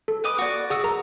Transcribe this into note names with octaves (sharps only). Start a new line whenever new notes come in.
A4
B4 D#5 D6
F#4 D5
F#4 G#4 D#6 E6
A#4 A#5